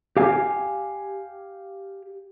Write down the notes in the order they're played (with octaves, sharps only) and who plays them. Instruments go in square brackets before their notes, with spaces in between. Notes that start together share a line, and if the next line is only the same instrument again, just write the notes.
[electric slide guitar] G4 F5 G#5